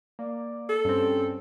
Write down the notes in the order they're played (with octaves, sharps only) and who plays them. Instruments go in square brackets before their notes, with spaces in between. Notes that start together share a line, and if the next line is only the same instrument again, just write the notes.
[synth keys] A#3 [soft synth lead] D5
[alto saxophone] A4
[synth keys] G2 C4 [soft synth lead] C#4